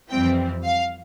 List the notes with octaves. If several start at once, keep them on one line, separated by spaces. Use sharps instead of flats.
F2 E3 G3 C4 G5
F5